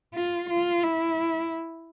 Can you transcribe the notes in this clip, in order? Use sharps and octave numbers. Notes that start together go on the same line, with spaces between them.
F4
F4
E4